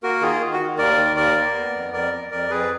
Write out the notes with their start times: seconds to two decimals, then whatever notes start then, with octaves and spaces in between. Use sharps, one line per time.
0.03 A#3 F#4 A#4
0.21 D#3 F4 G#4
0.40 D#3
0.53 F#4
0.59 D#3
0.78 D#2 A#4 D5
0.97 D#3
1.17 D#2 A#4 D5
1.36 A#3
1.54 B3
1.75 F2
1.93 F2 A#4 D5
2.12 F2
2.31 F2 A#4 D5
2.50 F2 G#4 B4